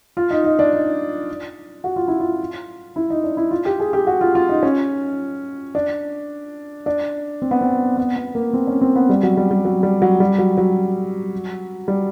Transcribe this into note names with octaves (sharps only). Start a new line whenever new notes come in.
F4
D#4
D#4
D4
D#4
F#4
F4
E4
F4
E4
D#4
D4
E4
F4
G4
G#4
G4
F#4
F4
F4
D#4
C#4
D4
D4
C4
B3
C4
B3
B3
A#3
C4
C#4
C4
B3
G3
F#3
G3
G3
F#3
G3
F#3
G3
F#3
F#3
G3